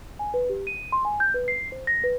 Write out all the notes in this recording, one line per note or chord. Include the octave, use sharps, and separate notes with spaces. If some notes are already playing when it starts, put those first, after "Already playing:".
G#5
B4
G4
D#7
C6
G#5
G6
B4
C7
C5
A#6
B4